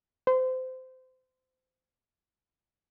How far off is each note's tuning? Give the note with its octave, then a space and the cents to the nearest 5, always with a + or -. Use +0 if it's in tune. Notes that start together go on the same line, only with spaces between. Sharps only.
C5 -25